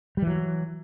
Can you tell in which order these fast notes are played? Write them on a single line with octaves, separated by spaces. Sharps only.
G3 E3 F#3